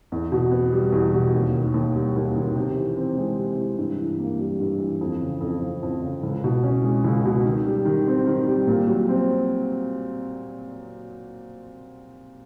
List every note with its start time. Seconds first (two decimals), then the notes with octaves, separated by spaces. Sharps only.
0.12 E2
0.32 B2
0.52 B3
0.73 G3
0.92 E2
1.13 B2
1.34 D#2
1.54 D#3
1.74 D#2
1.95 G3
2.16 D#2
2.35 D#3
2.55 C3
2.77 E3
2.96 C4
3.17 G#3
3.37 C3
3.57 E3
3.78 G2
3.99 E3
4.20 A#3
4.39 G3
4.60 G2
4.80 E3
5.01 F2
5.21 C#3
5.41 F2
5.61 F3
5.83 F2
6.02 C#3
6.23 C#2
6.44 B2
6.63 C#4
6.84 G#3
7.05 C#2
7.25 B2
7.45 D#3
7.66 G3
7.85 D#3
8.07 C4
8.27 D#3
8.47 G3
8.67 A#2
8.87 F#3
9.08 C4